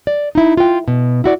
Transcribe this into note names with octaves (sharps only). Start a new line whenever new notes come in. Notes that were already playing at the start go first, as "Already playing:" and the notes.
D5
D#4 E4
F4 G5
B2
E4 F#4 D5